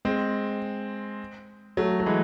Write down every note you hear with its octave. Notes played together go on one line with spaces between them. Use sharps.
G#3 C4
F#3 A3
F#3
E3 G#3